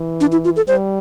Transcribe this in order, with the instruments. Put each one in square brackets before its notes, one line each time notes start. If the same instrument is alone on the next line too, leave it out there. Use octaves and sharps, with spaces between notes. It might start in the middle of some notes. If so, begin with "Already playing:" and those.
Already playing: [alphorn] E3
[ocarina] D4
E4
F4
A4
[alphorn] G3 [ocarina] C5